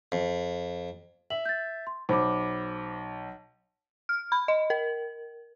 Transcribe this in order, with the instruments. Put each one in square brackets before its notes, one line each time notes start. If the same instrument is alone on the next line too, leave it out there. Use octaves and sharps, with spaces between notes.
[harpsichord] F2
[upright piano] E5 [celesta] F#7
[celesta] G6 A6
C6
[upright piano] B1 [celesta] C5 B5 D6
[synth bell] F6
B5
D#5
A#4